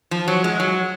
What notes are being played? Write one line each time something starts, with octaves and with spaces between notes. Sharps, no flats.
F3
F#3
G#3
F#3